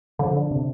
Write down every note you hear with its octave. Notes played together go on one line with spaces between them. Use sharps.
D3 F3
D4
C3